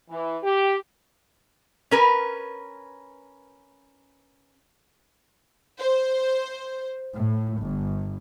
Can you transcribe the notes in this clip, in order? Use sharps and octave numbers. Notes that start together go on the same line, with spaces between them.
E3
G4
C#4 A#4 B4
C5
A2
G1